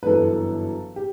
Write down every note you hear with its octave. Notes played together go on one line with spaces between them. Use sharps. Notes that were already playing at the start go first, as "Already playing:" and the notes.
B4
G1 F#2 E3 A4
G4